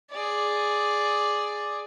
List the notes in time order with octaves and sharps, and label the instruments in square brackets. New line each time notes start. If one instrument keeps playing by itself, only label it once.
[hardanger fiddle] G#4 D5